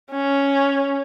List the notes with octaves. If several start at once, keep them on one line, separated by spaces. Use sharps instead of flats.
C#4